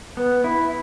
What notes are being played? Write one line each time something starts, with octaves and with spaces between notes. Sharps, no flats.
B3
E4